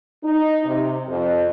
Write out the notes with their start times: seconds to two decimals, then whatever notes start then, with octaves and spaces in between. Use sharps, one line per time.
0.23 D#4
0.64 C3
1.08 F2